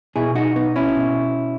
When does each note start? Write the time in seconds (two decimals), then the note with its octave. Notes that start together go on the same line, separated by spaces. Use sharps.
0.16 B2 E4 G#4
0.35 D#4 F#4
0.56 B3 D#4
0.76 C#4 E4
0.96 B2